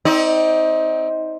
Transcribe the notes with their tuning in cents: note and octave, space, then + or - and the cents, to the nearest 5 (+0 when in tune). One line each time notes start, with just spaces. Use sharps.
C4 +0 D#4 +30 D5 +20